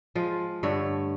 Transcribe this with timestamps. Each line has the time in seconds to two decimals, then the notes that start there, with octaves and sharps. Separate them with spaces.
0.15 F3 G#3 F4
0.63 G2 D3 A3 C#5